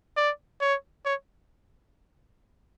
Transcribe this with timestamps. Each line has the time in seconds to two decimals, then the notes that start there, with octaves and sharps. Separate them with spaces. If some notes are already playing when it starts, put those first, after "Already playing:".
0.17 D5
0.61 C#5
1.05 C#5